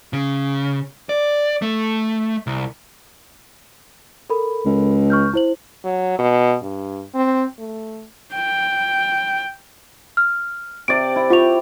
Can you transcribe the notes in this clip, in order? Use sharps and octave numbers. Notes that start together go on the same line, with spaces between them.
C#3
D5
A3
C2
A4 A#4 B5
C#2
C#6 F6 G6
E4 C5 F#7
F#3
B2
G2
C4
A3
G5
F6
C3 D5 D7
E4
F4 G4 G5 C#6 F7